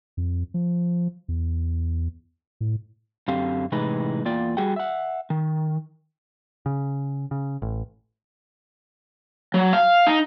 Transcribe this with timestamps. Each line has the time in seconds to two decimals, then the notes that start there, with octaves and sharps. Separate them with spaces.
0.17 F2
0.54 F3
1.28 E2
2.61 A2
3.28 F#2 D3 C4 G4 F5
3.72 A2 C3 E3 G#3 D#4 B4
4.25 E2 A#3 F4 D5 G5
4.57 G3 F#4 G#4 F#5 G5
4.76 E5 F#5
5.30 D#3
6.66 C#3
7.31 C#3
7.62 A1
9.54 F#3
9.73 F5
10.07 D#4